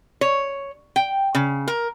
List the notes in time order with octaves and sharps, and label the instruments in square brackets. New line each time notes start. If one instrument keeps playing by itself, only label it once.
[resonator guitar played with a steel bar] C#5
G5
C#3
A#4